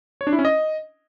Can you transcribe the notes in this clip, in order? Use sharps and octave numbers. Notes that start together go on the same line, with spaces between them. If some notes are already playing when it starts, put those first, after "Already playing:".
C#5
D4
E4
C#4
D#5